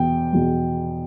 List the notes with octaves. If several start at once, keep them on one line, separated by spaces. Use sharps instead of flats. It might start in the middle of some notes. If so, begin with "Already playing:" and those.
Already playing: E2 B2 G5
E2 B2